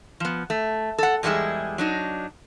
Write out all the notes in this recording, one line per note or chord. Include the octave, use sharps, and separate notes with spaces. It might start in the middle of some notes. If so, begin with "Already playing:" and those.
F3 B3
A3
A4 F#5
E2 G3 G#3 B3 E4 G#4
F#3 D4 D#4